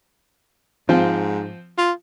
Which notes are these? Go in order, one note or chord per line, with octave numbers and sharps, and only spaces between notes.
G#2 F3 C4 F4
F4